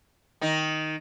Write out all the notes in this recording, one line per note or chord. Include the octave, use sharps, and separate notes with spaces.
D#3 D#4